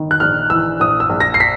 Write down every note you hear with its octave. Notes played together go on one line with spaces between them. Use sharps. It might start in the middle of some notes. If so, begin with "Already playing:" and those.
Already playing: G1 D#3
F#6
A#1 F6
E3 E6
A#1 D#6
E6
A#1
A#6
C7
B6